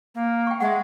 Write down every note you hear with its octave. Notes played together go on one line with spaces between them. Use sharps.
A#3
G5 C#6
G#3 E5 F#5